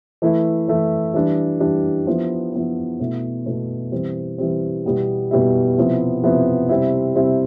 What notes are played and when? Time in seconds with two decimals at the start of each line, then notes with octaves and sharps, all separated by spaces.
0.22 E3 A3 E4
0.68 E3 A3 E4
1.14 E3 G3 D4
1.60 E3 G3 D4
2.07 F3 B3 E4
2.53 F3 B3 E4
3.00 B2 A3 E4
3.46 B2 A3 E4
3.92 E3 G3 C4
4.38 E3 G3 C4
4.85 B2 G3 B3 E4
5.31 B2 G3 B3 E4
5.77 C3 F3 B3 E4
6.23 C3 F3 B3 E4
6.69 C3 G3 C4 E4
7.15 C3 G3 C4 E4